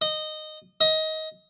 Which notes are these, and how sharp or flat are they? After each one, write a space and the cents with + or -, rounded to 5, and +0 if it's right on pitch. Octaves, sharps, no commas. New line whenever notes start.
D#5 -15
D#5 +20